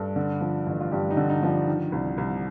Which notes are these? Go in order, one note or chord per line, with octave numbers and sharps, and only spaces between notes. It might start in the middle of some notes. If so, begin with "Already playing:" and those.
Already playing: G2 A4
D3
F3
A1
F4
G2 G4
D#4
D3
D#4
F3
D4
D#3
C2
C2